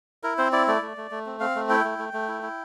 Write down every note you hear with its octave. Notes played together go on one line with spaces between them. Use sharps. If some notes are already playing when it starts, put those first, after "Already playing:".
E4 A#4
C4 C5
E4 D5
A3 D5
A3
A3
A3
C4
C4 F5
A3
E4 G5
A3
A3
A3
E4
E4